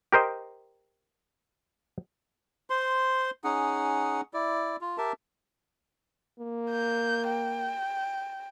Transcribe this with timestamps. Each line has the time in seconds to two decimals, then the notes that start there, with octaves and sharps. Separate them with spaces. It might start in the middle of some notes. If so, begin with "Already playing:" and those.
0.12 G4 A#4 C5 D#5
2.70 C5 C6
3.44 C#4 D#4 G#4 F#5
4.34 E4 D5
4.81 F4
4.98 G4 A#4 E5 A5
6.40 A#3
6.71 G6
7.28 G5